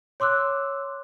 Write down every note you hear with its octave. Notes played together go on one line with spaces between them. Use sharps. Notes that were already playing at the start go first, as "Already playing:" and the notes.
C#5 C6 D6 E6 F#6